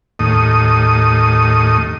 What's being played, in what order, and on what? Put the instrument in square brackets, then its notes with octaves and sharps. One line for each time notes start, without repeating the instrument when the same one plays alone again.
[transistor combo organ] D#2 A2 D#6